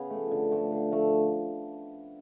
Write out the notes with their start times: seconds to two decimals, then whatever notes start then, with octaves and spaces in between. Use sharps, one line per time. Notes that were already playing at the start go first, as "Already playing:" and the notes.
Already playing: C#3 B3
0.10 F3 A3
0.31 D3
0.51 F3 A3
0.72 D3
0.92 F3 A3